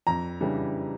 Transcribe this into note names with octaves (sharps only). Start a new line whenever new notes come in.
F2 A#5
C#3 E3 G3 D4